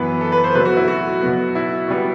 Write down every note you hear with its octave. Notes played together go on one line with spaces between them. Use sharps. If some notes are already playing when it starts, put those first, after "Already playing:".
Already playing: F#2 E3 B3 B4
A4
B4
C5
B2 F#3 A3 B4
F#4
E4
F#4
B2 F#3 B3
E4
B2 G3 B3